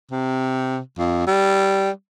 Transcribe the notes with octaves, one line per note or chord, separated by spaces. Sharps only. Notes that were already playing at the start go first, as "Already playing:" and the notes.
C3
F2
G3